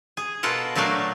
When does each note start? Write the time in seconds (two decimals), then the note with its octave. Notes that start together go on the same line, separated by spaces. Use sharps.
0.17 G#4
0.43 B2 F4 A4 A#4 F#5
0.75 A#2 F#3 A3 D4 F5